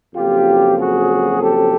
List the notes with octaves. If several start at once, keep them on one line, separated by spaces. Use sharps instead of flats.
F2 C#3 F#3 A#3 F4 G4
F#4 G#4
G4 A4